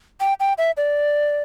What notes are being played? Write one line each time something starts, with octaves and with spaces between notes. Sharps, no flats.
G5
G5
E5
D5